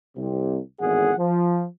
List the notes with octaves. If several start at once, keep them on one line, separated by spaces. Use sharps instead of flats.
C2 C3
G#1 E2 A2 G#4 F#5
F3